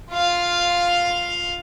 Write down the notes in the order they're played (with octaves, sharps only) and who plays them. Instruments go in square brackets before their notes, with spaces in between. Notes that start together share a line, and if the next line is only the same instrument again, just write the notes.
[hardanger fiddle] F4 F5